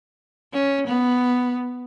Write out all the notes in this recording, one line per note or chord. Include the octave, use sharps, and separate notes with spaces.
C#4
B3